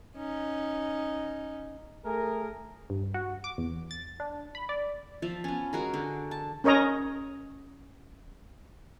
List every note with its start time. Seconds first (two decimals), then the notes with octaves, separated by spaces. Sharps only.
0.16 C#4 D#4
2.05 A3 G#4 A#4
2.90 G2
3.14 F#4
3.44 D6
3.58 E2
3.91 A6
4.20 D4
4.55 B5
4.69 D5
5.22 F3 E5 F5 A5
5.44 B3 C#4
5.73 G#3 F#4 G#4 A#4
5.94 D3
6.31 A5
6.64 C#4 A#4 C#5 D#5 A#5